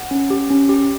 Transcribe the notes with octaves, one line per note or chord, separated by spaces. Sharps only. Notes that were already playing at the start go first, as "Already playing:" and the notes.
Already playing: F#5
C#4
G4
C#4
G4